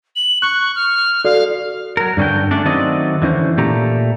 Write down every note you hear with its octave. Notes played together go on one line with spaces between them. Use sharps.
F#7
C#6 F#6
F6
F#4 A4 D5 F5
F#3 A#4
G2 D3 C#4 D4 G5
A3 C#4 D4
D#3 F#3 A3 C4 D5 D#5
D3 E3 C#4 C5
A#2 A3 G4 A#5